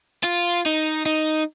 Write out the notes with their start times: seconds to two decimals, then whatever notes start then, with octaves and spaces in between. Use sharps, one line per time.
0.24 F4
0.66 D#4
1.06 D#4